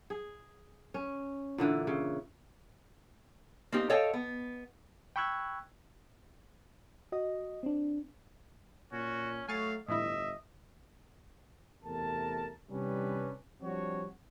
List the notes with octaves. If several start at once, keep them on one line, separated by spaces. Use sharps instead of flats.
G#4
C#4
A#2 D3 E3
C#3
A#3 C4 D#4 G4
A4 C#5 D#5 F5 G5 A5
B3
G5 B5 C#6 E6 F#6 G#6
F#4 D#5
C4 D4
A#2 C#4 F#4
F#3 A3 F5 G#5 C#6 A6
G1 A2 E3 E4 D#5 E5
E2 C3 A3 A#4 A5
C3 E3 G3 C#4 D4 B4
F3 G3 C4 D4 F#4 C#5